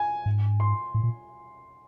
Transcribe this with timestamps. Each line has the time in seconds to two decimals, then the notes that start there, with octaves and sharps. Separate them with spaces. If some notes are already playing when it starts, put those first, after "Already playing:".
Already playing: G#5
0.26 G#2
0.60 C6
0.94 A2
1.04 A#2